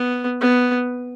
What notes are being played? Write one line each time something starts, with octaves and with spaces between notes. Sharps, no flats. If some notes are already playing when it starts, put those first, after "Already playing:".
Already playing: B3
B3